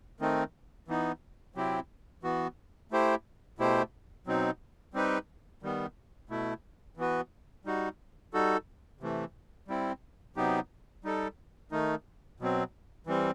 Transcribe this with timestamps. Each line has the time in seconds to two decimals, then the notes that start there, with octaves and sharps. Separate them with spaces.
0.20 D#3 A3 C4 D#4
0.88 E3 B3 D#4
1.55 C3 F#3 C4 E4 G4
2.23 E3 B3 F#4
2.91 A3 E4 G4 C5
3.59 B2 A3 E4 G4 C5
4.27 B2 F#3 C4 D#4
4.94 G3 C4 D#4 G4 B4
5.63 D#3 G3 B3
6.29 B2 A3 E4
6.97 E3 B3 F#4 B4
7.65 G3 D#4 F#4
8.34 G3 D#4 F#4 A4
9.01 C3 E3 A3
9.68 G3 C4 E4
10.36 C3 F#3 B3 D#4 G4
11.04 G3 D#4 A4
11.72 D#3 A3 D#4
12.40 B2 F#3 C4
13.07 E3 G3 C4